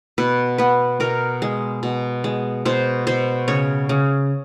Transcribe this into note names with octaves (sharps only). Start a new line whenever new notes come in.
B2 B4
B3 B4
B2 A#4
G#3
B2
G#3
B2 C5
B2 C5
C#3 C#5
C#3